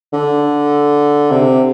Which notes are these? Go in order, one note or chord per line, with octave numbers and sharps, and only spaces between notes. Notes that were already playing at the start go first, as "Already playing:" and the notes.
D3
C3